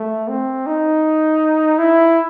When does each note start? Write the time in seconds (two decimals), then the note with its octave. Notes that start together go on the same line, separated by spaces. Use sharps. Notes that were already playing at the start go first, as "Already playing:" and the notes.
Already playing: A3
0.28 C4
0.66 D#4
1.79 E4